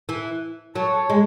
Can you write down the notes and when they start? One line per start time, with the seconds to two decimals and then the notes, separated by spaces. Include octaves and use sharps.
0.09 E3
0.75 F#3 A4 C#5
1.10 G#3